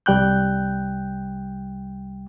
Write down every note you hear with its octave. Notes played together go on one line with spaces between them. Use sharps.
C2 G3 G5 F#6 G6